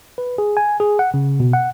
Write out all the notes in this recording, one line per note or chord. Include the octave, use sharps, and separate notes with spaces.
B4
G#4
G#5
G#4
F#5
C#3
B2
F#5